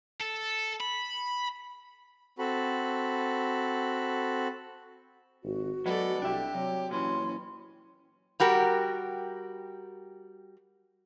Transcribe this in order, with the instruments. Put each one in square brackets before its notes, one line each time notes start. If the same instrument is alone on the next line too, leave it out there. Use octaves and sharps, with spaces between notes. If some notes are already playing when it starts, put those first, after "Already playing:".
[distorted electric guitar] A4
B5
[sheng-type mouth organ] C4 F#4 A4 B5
[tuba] G#1 [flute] F#4
[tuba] F#3 [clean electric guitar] G#3 B3 [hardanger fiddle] A4 D5
[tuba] C2 [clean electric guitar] D4 E5 [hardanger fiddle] G4
[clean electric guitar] C3 [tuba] F#3 [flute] C#5
[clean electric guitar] A#2 E3 [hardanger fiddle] C#4 [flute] C6
[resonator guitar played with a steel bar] G3 F#4 G4 A#4